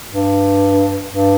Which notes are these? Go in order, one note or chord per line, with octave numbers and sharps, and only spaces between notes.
G2
G2